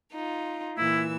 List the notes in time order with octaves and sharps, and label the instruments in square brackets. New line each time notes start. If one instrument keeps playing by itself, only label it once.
[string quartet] D#4 F4
[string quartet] A#2 E3 E6 [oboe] E4